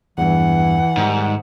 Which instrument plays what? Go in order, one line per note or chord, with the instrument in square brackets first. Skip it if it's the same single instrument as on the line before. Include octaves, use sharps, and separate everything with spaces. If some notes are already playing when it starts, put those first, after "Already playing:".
[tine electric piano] E2 G2 [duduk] E3 [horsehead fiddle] F#5
[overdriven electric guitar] G#2 [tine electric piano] D#3 G3